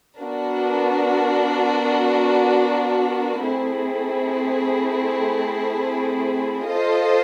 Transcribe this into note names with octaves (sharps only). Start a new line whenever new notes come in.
B3 D4 F#4 A#4
A3 C4 E4 G#4
F4 A4 C5 D#5